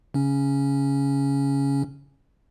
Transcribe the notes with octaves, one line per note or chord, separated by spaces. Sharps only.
C#3 C#4